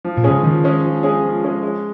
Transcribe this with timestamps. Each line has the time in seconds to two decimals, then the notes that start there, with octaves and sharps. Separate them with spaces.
0.05 F3
0.17 A#2
0.24 G#3 C#4 G#4
0.31 C#3
0.43 D#3 F3
0.64 G#3 C#4 G#4
0.84 F3
1.03 G#3 C#4 G#4
1.24 F3
1.43 G#3 C#4 G#4
1.63 G#3